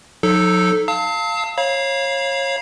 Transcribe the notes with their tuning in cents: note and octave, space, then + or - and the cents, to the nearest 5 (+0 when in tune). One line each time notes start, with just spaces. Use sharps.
F#3 -40 D#4 +0 A4 -5
F5 +0 A5 +30 E6 -40
C#5 -25 F5 +0 B5 -45